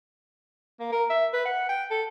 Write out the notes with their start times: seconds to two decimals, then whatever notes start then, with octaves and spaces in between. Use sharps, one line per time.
0.80 A#3
0.92 A#4
1.10 E5
1.33 B4
1.45 F#5
1.69 G5
1.91 A4